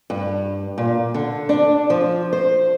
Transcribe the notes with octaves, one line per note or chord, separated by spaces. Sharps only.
G2
A#2
D3
D4
F3
C5